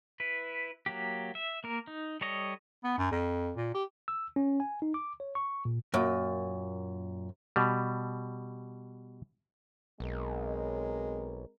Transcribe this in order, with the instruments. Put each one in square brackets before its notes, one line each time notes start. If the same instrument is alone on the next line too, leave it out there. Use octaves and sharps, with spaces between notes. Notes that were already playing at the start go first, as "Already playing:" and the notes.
[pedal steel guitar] E4 B4
F#3 A#3 G4
E5
A#3 A#4
D#4
G3 A4 C#5 D#5
[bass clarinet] B3
F#2
F2
A#2
G4
[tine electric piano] E6
C#4
G#5
D#4
D6
C#5
C#6
A#2
[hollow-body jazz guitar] F#2 A#2
[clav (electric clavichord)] B2 G3
[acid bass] B1 [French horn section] G#3 C4 A#4